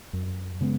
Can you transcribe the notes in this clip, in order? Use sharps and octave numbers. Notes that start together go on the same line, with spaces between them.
F#2
C#3 G#3 B3